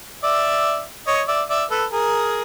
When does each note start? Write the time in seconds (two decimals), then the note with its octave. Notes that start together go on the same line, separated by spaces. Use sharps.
0.24 D5 E5
1.07 C#5 D#5
1.28 D5 E5
1.50 D5 E5
1.71 A4 B4
1.91 G#4 A#4